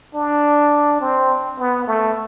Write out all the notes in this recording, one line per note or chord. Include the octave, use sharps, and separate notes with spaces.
D4
C4
B3
A3